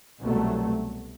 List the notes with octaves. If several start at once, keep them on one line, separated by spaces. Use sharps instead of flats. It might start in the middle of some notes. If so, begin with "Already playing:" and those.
C2 B2 F#3 A3